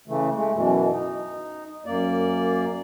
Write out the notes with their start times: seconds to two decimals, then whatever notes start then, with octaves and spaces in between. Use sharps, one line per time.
0.08 C#3 E3 A3
0.35 G#3 A3
0.54 F#2 B2 E3
0.91 D#4
1.86 F#2 A#3 D5